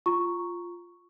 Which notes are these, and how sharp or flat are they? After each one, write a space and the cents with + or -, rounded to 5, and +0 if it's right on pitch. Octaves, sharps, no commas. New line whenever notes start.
F4 +0 A#5 +0 C#6 +0